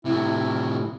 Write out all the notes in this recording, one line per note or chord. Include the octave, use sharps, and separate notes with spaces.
A2 C3 E4